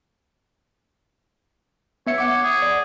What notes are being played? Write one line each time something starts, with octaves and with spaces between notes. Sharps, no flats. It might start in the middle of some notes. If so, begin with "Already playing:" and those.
B3 C#5 E5 C#7
F#5 D6
G#4
D5